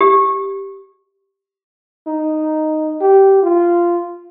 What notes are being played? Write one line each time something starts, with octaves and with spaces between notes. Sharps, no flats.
G4
D#4
G4
F4